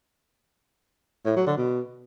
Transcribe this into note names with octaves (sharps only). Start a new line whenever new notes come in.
A2
F#3
D3
B2